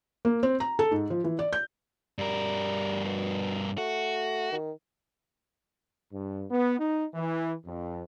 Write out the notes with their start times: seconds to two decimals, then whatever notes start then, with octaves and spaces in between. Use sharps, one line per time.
0.25 A#3
0.43 C4
0.60 A#5
0.79 A4
0.91 G#2
1.10 F3
1.24 E3
1.39 D5
1.53 G6
2.18 G2 G3 A#4
3.05 B2
3.78 A3 F#4
4.52 D#3
6.13 G2
6.51 B3
6.80 D#4
7.15 E3
7.66 F2